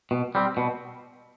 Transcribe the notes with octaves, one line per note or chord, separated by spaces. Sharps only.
B2
G3 C4
B2